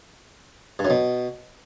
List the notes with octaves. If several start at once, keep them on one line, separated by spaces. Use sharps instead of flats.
G2
F#2
B2